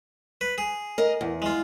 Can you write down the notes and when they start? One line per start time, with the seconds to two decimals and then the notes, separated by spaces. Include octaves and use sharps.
0.41 B4
0.58 G#4
0.98 A#4 D#5
1.21 E2
1.42 G#3 F4